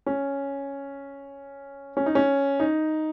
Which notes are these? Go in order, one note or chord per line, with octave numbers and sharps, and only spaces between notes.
C#4
C#4
D#4
C#4
D#4